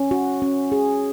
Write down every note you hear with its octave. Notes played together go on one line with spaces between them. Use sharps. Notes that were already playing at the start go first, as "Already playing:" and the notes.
Already playing: C#4
F#4
C#4
G#4